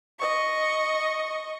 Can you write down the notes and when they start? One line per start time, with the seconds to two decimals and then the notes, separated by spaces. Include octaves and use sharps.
0.19 D#5 C#6